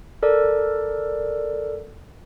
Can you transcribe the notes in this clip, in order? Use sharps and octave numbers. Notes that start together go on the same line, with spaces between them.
A4 A#4 D5